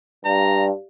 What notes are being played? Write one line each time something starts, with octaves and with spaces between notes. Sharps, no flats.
G2 G4 D5 F5 A#5